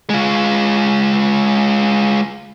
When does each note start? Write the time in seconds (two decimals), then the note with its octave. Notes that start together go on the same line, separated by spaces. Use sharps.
0.09 G#3 F4